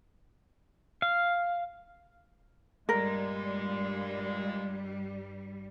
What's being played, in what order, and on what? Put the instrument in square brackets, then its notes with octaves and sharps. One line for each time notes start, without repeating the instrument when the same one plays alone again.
[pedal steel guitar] F5
[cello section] G2 G3 [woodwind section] A#2 G#3 [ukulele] A#4